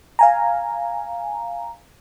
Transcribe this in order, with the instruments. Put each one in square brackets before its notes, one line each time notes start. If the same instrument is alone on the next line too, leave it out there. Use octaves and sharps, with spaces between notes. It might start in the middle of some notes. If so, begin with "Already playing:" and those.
[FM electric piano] F5 G#5 A#5